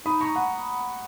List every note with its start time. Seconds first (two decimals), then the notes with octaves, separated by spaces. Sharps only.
0.06 D#4 B5 D#6
0.21 A#5 C#6
0.36 F#5 A#5